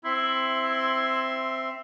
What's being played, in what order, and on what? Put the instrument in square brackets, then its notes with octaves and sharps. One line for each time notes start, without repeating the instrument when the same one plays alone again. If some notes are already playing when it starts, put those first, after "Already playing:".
[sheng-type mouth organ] C4 E5 C6 [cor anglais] E4